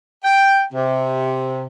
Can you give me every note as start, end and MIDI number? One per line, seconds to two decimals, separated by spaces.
0.24 0.62 79
0.73 1.66 48